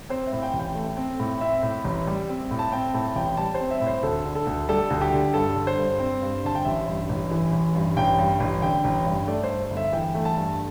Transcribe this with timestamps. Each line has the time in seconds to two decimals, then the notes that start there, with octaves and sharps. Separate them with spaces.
0.10 C4 C5
0.27 E5
0.33 A2
0.42 G5
0.53 A1
0.59 G5
0.75 A3
0.97 C4
1.20 A2
1.41 C4 E5
1.63 A2
1.84 A1
2.07 G3
2.29 C4
2.51 A2
2.59 A5
2.72 C4 G5
2.94 A2 A5
3.16 A1 G5
3.37 G3 A5
3.54 C5
3.60 C4
3.71 E5
3.81 A2
3.87 C5
4.03 D2 A4
4.25 D3
4.35 A4
4.47 D2
4.69 G3 A4
4.90 D2
5.01 G4
5.12 D3
5.34 G2 A4
5.56 D3
5.67 C5
5.78 G2
6.00 C4
6.22 G2
6.44 D3 A5
6.55 G5
6.65 A1 E5
6.87 G2
7.09 A1
7.31 E3
7.53 A1
7.75 G2
7.97 A1 G5
8.18 G2
8.40 A1
8.62 D3 G5
8.84 A1
9.05 G2
9.27 A3 D5
9.44 C5
9.49 G2
9.70 G1
9.77 E5
9.93 E3 G5
10.15 A3
10.25 A5
10.36 G2